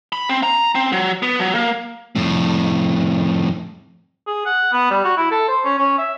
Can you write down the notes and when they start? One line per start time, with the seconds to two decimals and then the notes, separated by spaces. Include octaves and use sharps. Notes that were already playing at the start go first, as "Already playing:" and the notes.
0.13 B5
0.29 C4
0.43 A#5
0.75 C4
0.92 F#3
1.23 B3
1.40 F#3
1.55 A#3
2.15 F2 A2
4.27 G#4
4.46 F#5
4.72 B3
4.90 G3
5.04 F#4
5.17 E4
5.31 A4
5.48 C5
5.65 C#4
5.78 C#4
5.98 E5